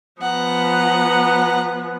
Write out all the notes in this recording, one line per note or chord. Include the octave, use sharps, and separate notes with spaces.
F3 B3 F#5 A#5